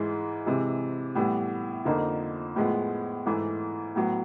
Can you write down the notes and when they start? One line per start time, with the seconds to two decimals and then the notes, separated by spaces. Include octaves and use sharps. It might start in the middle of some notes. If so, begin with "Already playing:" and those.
Already playing: G#2 E3 G#3
0.46 C3 E3 G#3
1.15 A2 E3 G3 B3
1.85 F2 D3 F3 A#3 D#4
2.56 A2 F3 G#3 B3
3.26 G#2 E3 A3
3.95 A2 F#3 B3